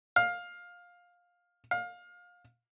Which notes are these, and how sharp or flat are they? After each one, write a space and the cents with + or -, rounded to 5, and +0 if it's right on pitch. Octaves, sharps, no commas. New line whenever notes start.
F5 +15
F5 +25